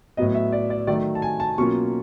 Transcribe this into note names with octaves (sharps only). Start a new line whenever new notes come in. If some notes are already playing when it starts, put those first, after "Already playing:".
A2 F#3 B3 D#5
E5
D5
D5
D#3 F#3 A3 D5
A5
G#5
A5
B2 F#3 A#3 C#4 F4 C#6